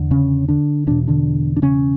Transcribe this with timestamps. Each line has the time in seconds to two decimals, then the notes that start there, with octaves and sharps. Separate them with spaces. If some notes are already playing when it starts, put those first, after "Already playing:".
Already playing: E2 D3
0.11 C#3 C#4
0.48 D3 D4
0.87 E2 B2 D4
1.07 D3 D4
1.56 D4
1.62 C#3 C#4